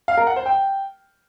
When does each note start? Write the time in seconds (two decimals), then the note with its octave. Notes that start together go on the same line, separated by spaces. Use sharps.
0.08 F5
0.17 A#4
0.27 F#5
0.36 C5
0.46 G5